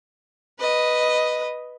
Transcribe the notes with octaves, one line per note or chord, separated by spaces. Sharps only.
B4 D#5